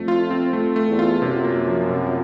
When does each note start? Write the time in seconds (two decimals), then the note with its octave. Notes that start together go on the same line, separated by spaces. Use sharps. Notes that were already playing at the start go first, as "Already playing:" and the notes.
Already playing: F2 A3
0.08 F4
0.31 C4
0.53 A3
0.76 A3
0.88 E2
0.99 F4
1.22 F#2 C3
1.44 A#3
1.67 F3
1.90 C3